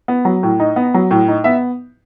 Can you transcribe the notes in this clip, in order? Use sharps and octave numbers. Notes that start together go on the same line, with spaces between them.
B3
F#3
A2
D#4
B3
F#3
A2
D#4
B3 E5